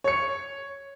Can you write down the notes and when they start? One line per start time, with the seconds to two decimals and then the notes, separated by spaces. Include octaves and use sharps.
0.04 C#5 C#7